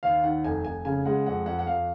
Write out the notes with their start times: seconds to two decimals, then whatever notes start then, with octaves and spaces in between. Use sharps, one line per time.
0.03 D#2 F5
0.24 D#3 F#5
0.44 F1 G#5
0.65 F1 G#5
0.85 C#3 G#5
1.05 G#3 F#5
1.26 F2 F#5
1.46 F2 F#5
1.59 F#5
1.67 F2 F5